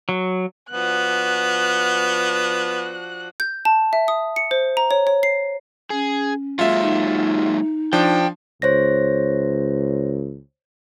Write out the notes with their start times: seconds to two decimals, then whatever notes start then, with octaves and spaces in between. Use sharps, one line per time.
0.09 F#3
0.70 F3 B3 D4 F#4 F#6
3.40 G6
3.65 A5
3.93 E5
4.08 D#6
4.36 C#7
4.51 C5
4.77 A#5
4.91 C#5
5.07 C#5
5.23 C7
5.90 C#4 G#4
6.59 F#3 G#3 A#3 F4 E5
6.81 D#4
7.93 F3 D4 G5
8.62 C#2 C5 C#5 A#6